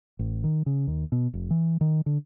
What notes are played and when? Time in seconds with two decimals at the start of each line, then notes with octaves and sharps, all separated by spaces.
0.19 A1
0.44 D#3
0.66 C#3
0.87 D#2
1.12 B2
1.33 F1
1.51 E3
1.81 D#3
2.06 D3